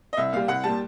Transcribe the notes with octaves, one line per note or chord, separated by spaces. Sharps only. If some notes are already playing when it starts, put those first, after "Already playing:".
D#5
C2 E5
A#2 G3 F5
C2 F#5
A#2 G3 A5